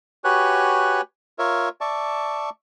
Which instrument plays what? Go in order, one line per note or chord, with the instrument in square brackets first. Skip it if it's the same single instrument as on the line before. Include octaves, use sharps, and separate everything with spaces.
[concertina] F#4 G4 B4 C#5 G#5 F#6
F4 A#4 C#5 E5
D5 E5 A5 C#6